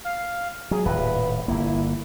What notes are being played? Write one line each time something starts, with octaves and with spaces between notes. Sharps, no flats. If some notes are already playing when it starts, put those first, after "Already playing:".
F5
F#3 G#4
D#1 A2 B4
G1 A#3 E4